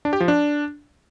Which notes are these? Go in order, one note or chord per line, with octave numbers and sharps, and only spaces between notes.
D4
G4
F3
D4